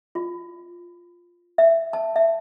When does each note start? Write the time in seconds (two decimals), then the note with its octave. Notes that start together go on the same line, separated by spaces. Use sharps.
0.15 F4
1.58 E5
1.93 A5
2.16 E5